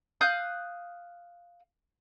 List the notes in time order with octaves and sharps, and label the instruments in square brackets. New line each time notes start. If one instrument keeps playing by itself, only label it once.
[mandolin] F5 D#6 F#6 G6